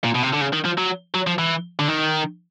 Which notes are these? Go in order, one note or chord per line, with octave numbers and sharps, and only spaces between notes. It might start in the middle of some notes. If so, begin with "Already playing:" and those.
A#2
B2
C3
D3
C#3
D#3
F3
F#3
F#3
F3
E3
D3
D#3